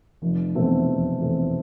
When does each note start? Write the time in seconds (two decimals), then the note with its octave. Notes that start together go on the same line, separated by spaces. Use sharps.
0.22 F1
0.55 E2 B2 A3 C4
0.87 F1
1.20 E2 B2 A3 C4